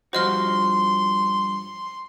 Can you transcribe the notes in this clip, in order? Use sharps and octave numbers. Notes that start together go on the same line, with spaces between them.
G2 F3 F#4 C5 D#5 C6 F6